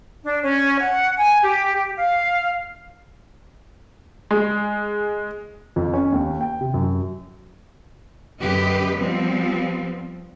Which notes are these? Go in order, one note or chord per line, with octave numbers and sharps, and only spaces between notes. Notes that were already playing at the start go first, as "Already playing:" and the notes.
D4
C#4
F#5
G#5
G4
G4
F5
G#3
F2
C#4
D#2
G5
C3
F#2
F#2 D3 G4 B4 D#5
F3 G3 B3 C4